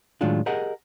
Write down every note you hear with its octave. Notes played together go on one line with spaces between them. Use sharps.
A2 D#3 F#3 G#3 D4 F4
G4 G#4 A#4 D#5 F#5